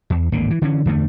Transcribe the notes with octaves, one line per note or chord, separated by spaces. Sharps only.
E2
D1 G#1 D3 A#3
E3
D3 E3 C#4
E2 G2 D3 A3